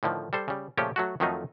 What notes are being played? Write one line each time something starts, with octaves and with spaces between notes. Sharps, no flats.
A2 D3 D#3 F3
G3 A4 C5
C#3 G3
A#2 C#3 F3 A3 C#4 G4
F#3 A3 F#4
F2 D#3 F3 F#3 A3 D#4